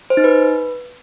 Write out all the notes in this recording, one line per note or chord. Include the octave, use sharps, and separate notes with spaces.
C5
D#4
B4